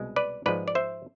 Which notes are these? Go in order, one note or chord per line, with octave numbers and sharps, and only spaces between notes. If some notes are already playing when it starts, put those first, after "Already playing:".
Already playing: C2 B2 G#3
B4 D5
G#2 F3 G#3 B4 D5
D5
C5 E5